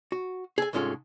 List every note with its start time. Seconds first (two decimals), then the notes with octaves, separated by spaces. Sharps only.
0.12 F#4
0.58 G#4 A4 G#5
0.73 C2 G#2 G#3 C#4 F4 A4